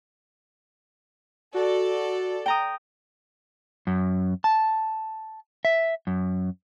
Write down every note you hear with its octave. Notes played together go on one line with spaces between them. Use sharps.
F#4 A4 D5
G5 A#5 D#6
F#2
A5
E5
F#2